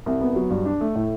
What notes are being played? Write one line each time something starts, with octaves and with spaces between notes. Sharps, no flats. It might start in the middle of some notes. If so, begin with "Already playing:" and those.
C2
B3
F#3
G2
D4
A3
A2